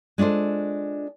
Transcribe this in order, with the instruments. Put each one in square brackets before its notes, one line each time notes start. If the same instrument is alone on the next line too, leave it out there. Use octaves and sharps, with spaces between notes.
[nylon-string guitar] G#3 D4 F4 A4 C5